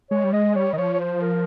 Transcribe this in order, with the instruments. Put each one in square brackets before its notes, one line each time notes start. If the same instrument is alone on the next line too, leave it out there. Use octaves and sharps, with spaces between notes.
[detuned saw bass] G#3 [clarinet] C#5
[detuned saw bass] G3
[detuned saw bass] G#3 [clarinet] D#5
[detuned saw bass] G3 [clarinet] C#5
[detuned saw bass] D#3 [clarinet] D#5
[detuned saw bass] F3 [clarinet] C#5
[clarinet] C#5
C5
A#4